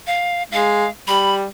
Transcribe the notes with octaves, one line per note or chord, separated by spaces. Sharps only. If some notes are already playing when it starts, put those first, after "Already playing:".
F5
G#3 F5
G3 B5